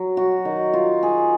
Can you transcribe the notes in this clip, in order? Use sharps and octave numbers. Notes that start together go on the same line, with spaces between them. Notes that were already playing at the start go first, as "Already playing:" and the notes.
Already playing: F#3
F#4
D#3
F4
G#4